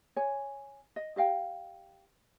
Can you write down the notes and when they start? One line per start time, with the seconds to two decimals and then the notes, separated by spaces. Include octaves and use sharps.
0.16 C#5 G#5
0.96 D#5
1.16 G4 D#5 F5 G5